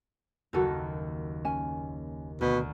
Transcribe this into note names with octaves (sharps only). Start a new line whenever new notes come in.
F#1 D#2 F#4 A4 A#4
C#4 G#5
D2 B2